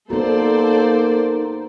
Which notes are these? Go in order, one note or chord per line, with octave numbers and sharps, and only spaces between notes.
A#3 B3 D#4 F#4 A4 C5 D5